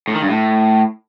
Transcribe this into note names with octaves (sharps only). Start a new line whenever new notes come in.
A2
D#3
G2
A2